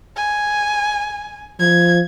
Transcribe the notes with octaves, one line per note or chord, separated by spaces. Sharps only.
G#5
F3 G#6